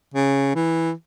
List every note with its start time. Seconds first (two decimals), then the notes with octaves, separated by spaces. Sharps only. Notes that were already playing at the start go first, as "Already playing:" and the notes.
0.14 C#3
0.55 E3